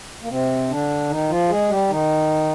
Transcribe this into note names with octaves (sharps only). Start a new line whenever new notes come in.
A#3
C3 C4
D3 D4
D#3 D#4
F3 F4
G#3 G#4
G3 G4
D#3 D#4